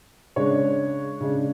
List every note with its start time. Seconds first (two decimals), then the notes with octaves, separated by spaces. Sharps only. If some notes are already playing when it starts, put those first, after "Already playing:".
0.36 C#3 G#3 D4 C#5
1.21 C#3 G#3 D4